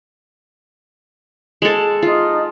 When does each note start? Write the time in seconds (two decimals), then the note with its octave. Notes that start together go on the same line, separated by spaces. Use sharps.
1.62 G#3 A4
2.02 D#4 F4